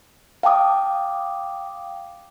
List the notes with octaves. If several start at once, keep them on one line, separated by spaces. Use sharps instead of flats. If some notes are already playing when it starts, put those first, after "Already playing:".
F5 G5 A5 D6 D#6